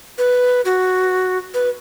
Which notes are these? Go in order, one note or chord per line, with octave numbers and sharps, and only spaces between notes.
B4
F#4
B4